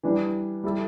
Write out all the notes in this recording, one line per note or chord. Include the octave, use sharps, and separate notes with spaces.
E3 G3 D4
G3 E4 A4